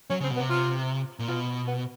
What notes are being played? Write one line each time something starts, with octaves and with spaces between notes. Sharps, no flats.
F#3 C#4
C#3 C4
B2
B3
C3
F4
A#2
B2 F4
B3